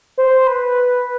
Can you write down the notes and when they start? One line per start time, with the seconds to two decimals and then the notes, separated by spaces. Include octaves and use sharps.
0.18 C5
0.47 B4